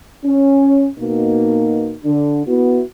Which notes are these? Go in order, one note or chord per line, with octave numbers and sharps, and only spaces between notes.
C#4
B2 A#3 D#4
D3 D4
B3 E4 F#4